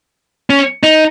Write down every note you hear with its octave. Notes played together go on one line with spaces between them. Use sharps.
C#4
D#4